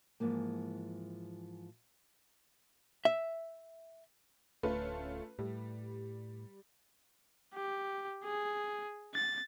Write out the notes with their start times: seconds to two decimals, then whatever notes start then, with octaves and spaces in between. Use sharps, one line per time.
0.20 G#2 E3 F3 A#3
3.05 E5
4.63 D1 A3 C#4 F4 B4
5.39 A2 G3
7.55 G4
8.24 G#4
9.14 A6